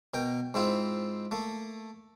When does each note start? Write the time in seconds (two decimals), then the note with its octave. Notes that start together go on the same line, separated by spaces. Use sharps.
0.14 B2 A#4 G5
0.54 G#2 C4 E4 F4
1.31 A3 A#3